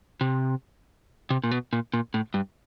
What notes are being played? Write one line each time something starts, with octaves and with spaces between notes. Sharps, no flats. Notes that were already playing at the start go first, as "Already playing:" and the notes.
C3
C3
A#2
B2
A#2
A#2
A2
G2